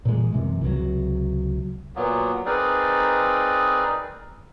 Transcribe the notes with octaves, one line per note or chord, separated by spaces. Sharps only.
A#2 E3 F#3 G#3
F#2 C3 E3
C#2 C3 D#3 F#3
A#2 F#3 A#3 B3
C4 D#4 G#4 A#4 B4 D5